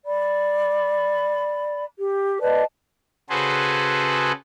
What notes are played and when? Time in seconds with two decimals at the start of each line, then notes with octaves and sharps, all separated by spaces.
0.06 D5 B5
1.98 G4
2.40 B4 D5 D#5 A5
3.30 C#3 F#4 G#4 A4 B4 C5